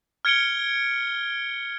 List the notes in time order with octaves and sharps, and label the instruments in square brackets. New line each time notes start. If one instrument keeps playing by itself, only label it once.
[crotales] F6 G#6 C#7 D7 G7